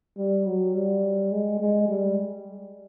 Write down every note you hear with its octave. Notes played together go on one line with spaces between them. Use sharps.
G3
F#3
G3
G#3
G#3
G3